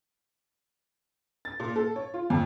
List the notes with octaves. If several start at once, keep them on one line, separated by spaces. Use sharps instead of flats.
A6
A#2
A4
C#5
F4
F2